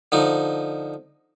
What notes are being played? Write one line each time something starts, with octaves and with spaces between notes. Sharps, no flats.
D3 F3 D#4